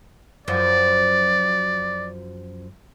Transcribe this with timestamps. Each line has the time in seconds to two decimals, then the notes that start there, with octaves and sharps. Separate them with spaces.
0.48 F#2 F3 D5